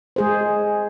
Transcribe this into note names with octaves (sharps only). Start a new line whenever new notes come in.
G#3 G#4 C5